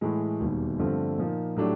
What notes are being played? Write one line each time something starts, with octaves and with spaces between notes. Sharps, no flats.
A2 E3 G#3
E1 D#2 D#3 G3
G2 D3 F3 A3 C4
A#2 F3 A#3 D#4
A2 F#3 A3 D4 G4